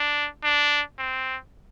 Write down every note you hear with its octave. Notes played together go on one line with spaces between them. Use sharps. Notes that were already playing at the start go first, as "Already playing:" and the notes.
Already playing: D4
D4
C4